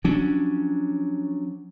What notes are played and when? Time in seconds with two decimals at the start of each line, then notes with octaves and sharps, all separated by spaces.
0.04 F3 F#3 C#4 D4